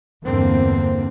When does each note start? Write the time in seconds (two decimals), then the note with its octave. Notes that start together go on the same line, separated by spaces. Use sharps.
0.23 E2 G2 D3 A#3 C4